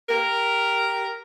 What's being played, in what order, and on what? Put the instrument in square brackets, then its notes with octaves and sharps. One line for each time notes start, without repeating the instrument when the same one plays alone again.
[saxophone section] G4 A#4